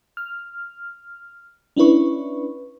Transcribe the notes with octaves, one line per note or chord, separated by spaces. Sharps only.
F6
C#4 D4 E4 B4 C#6